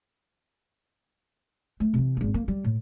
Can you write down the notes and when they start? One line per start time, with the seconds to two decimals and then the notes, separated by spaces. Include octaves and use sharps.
1.80 A3
1.94 C3 E3
2.17 G#1 B3
2.34 A#3
2.48 G3
2.64 A2